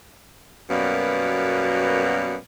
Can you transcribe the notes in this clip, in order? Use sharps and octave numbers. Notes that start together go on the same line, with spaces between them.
F#2 B2 G3 A#3 B3